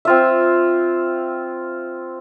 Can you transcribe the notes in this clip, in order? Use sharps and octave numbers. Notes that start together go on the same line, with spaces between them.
C4 F4 E5